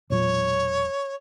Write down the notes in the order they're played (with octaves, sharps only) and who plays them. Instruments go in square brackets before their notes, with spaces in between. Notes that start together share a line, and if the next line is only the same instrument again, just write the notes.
[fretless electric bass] E1 A#2 F#3 [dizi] C#5